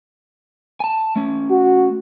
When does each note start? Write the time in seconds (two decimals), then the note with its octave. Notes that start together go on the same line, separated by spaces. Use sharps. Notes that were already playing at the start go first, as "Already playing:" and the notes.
0.80 G#5 A5
1.16 A3 C#4
1.51 F#4